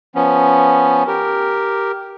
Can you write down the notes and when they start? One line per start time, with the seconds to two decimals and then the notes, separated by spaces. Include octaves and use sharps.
0.15 F3 B3 C#4
1.07 G4 A#4